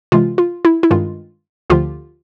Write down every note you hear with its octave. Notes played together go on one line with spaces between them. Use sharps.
C3 E3 G#3 F4
F4
E4
E4
G2 D#3 G#3 F4
D2 D3 F3 F4 G4